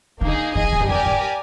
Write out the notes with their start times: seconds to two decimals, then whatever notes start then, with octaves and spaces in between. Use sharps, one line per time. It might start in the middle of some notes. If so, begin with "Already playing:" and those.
0.21 D3 A#3 D#4 G#4
0.55 D#3 G#4 D#5 G#5
0.64 D3
0.72 C3
0.80 G2
0.89 F2 G4 A#4 D5 G#5
1.06 G2